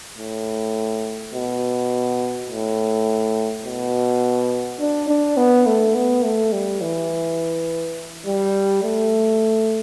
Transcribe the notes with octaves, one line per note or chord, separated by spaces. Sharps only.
A2
B2
A2
B2
D4
D4
B3
A3
B3
A3
G3
E3
G3
A3